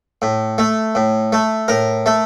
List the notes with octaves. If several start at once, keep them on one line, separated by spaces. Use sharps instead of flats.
A2
A3
A2
A3
A2 A#4
A3